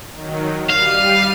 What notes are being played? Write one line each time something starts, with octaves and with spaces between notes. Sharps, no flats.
D#3 F#3
G3 F5 D#7